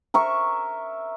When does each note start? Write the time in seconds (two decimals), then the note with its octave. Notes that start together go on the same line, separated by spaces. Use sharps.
0.14 A#4 E5 C#6